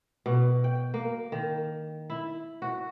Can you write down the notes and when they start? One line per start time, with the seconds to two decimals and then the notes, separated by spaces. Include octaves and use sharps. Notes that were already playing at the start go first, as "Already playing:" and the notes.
0.26 B2
0.64 G5
0.94 A#3
1.32 D#3
2.10 E4
2.62 F#4